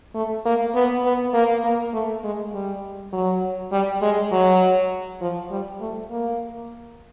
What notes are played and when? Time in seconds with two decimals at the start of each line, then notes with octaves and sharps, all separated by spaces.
0.15 A3
0.46 A#3
0.75 B3
1.04 B3
1.34 A#3
1.64 A#3
1.93 A3
2.24 G#3
2.54 G3
3.13 F#3
3.72 G3
4.02 G#3
4.32 F#3
5.21 F3
5.51 G3
5.81 A3
6.11 A#3